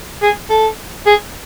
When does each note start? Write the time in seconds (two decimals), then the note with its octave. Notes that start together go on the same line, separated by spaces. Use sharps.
0.22 G#4
0.49 A4
1.06 G#4